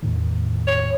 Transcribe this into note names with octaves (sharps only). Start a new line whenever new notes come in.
E2 A2 D#3
C#5